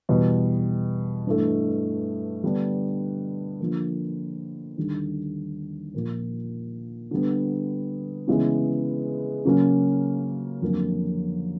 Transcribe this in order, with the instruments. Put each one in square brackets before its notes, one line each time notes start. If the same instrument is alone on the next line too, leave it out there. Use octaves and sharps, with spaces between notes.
[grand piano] E2 B2 G3
G2 E3 A3
D3 G3 B3 D4
D3 F3 A#3
D#2 D3 G3
A#2 F3 A#3
D3 G3 B3
C#3 E3 G#3 B3
C#3 F#3 A#3 C#4
F2 D3 F#3 A#3